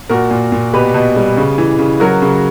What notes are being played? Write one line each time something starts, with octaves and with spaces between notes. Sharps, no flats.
A#2 F#4 A#4
A#2
A#2
B2 G4 B4
B2
G3
C#3
E3
C#3
F#3 F#4 A#4
C#3